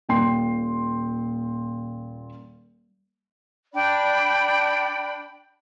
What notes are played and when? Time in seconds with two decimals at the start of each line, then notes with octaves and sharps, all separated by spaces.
0.09 D#1 A#2 G5 C6 C7
3.74 D4 D5 G5 B5